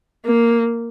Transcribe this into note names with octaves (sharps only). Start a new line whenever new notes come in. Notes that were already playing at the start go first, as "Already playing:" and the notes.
A#3